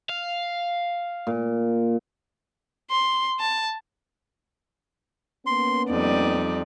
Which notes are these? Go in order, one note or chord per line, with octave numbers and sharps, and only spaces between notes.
F5
A#2
C6
A5
A#3 B3 C#4 C6
F2 G3 D#4 D5